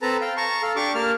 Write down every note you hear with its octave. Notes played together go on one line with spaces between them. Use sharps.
C4 A4 B4 A5 A#5
F5 G5
A5 A#5 C#6
A4 F5
D4 G4 C#6 D6
A#3 A#4 A5 F6